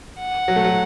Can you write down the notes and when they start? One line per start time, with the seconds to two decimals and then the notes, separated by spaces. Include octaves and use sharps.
0.20 F#5
0.48 F#3
0.56 A3
0.64 F#3